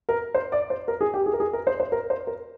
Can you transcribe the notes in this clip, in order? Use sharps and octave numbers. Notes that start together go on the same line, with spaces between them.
A#4
C5
D5
C5
A#4
G#4
G4
G#4
A#4
G#4
A#4
C5
C5
A#4
C5
A#4